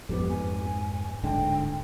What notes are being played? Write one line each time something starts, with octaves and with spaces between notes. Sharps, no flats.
F2 G#2 B3 G4
G#5
D1 G#2 D3 G5